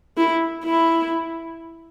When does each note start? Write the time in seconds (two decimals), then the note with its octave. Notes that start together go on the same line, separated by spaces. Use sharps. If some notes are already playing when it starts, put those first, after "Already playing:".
0.17 E4
0.65 E4